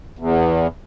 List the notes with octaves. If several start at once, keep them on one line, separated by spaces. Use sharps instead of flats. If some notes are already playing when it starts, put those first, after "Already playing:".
E2